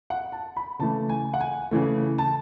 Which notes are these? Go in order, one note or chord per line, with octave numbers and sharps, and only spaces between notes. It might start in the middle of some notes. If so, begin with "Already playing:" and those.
F#5
A5
B5
C#3 E3 A3 A5
G#5
F#5
G#5
C#3 E3 A3
A5